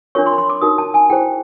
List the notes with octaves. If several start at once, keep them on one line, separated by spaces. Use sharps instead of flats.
D4 F4 A#4 C#5 C#6
C6
B5
C6
D6
D#4 F#4 A#4 D#6
A5
G#5
E4 G#4 C5 G5